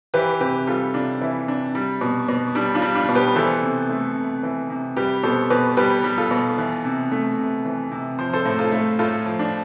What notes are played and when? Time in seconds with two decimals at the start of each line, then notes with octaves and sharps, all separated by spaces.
0.14 E3 G4 B4
0.41 C3 G4 B4
0.67 G3 F4 A4
0.94 C3 D4 F4
1.21 E3 E4
1.48 C3 D4
1.75 G3
2.01 B2
2.29 B2
2.55 G3 D4
2.75 D4 F4
2.82 G3
2.95 D4 F4
3.09 B2
3.15 G4 B4
3.35 E3 A4 C5
3.62 C3
3.90 A3
4.16 C3
4.43 E3
4.70 C3
4.96 G3 G4 B4
5.23 B2 A4 C5
5.50 B2 G4 B4
5.77 G3 G4 B4
6.04 G3
6.17 F4 A4
6.31 B2
6.58 E3
6.85 C3
7.12 A3
7.38 C3
7.65 E3
7.92 C3
8.19 F3 C5
8.33 A4 C5
8.46 A2
8.59 F4 A4
8.72 A3
8.99 A2 F4 A4
9.26 F3
9.39 D4